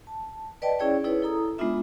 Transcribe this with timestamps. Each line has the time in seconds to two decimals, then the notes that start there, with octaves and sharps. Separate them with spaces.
0.07 A5
0.62 B4 D5 D#5 G5 A5
0.79 C#4 E4 G#4 C#5 D5 G5
1.04 D#4 E4 G#4 B4 C#5
1.22 E4 A4 A#5 D#6
1.58 G#3 B3 D4 D#4 F4 E5